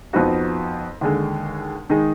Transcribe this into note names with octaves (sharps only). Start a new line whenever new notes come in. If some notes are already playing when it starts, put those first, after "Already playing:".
F2 F3 B3 D#4 F#4
D#2 D3 G#3
D#3 G#3 D#4